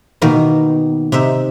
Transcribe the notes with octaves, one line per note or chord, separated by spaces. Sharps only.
B2 D#3 A#3 B3
C3 D#4 E5